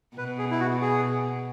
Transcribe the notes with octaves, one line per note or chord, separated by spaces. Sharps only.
B2 B4
G#4
E4
F#4
G#4